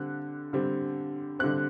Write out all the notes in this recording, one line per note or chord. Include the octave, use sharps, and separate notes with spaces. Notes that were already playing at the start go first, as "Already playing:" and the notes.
Already playing: D3 G3 C4 F#6
D3 G3 C4
D3 G3 C4 F#6